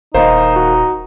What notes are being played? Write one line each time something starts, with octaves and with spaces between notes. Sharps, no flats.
D#1 D#3 A#3 D#4 C5
F#4